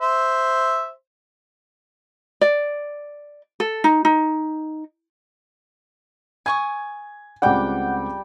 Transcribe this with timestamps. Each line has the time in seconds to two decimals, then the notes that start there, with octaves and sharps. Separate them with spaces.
0.01 C5 E5
2.41 D5
3.60 A4
3.84 D#4
4.05 D#4
6.46 G#5 C#6 D#6 G#6
7.42 C#2 G3 C4 D5 F#5 G5 D6